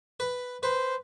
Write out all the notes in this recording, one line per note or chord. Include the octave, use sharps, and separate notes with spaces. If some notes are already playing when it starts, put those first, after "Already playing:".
B4
B4 C5